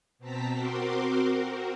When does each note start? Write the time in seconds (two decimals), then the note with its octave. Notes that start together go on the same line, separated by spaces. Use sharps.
0.19 B2 C4 A5 A#5 B6
0.50 C4 F#4 A#4 C6 D6
1.20 C4 F#4 A#4